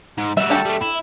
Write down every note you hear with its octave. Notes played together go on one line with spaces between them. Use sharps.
G#2
G3 F#4 E5
D4 G4 A4
G3 A3
E4